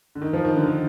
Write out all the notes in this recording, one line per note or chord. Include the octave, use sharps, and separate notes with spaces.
D3
D#3
F3
D#3
D3
D#3